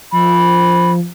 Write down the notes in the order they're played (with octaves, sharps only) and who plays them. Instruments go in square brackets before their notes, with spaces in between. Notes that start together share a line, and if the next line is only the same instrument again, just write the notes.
[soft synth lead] F3 [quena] B5